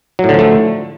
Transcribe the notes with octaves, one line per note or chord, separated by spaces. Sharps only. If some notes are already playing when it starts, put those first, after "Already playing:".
A2 D3 F3 F#3 A3